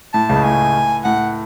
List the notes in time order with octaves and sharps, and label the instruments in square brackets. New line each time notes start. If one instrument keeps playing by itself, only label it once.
[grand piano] A2 [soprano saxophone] A5
[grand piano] C#2 C#3
[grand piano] A2 [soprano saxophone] G#5
[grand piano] A2 [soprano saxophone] F#5